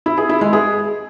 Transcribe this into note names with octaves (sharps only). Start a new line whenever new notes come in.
E4
G#4
E4
G#3
G#4